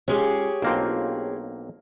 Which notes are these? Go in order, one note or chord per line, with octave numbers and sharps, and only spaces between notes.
G#3 C#4 F4 G4 G#4 C#5
B1 A#3 C4 D4 F4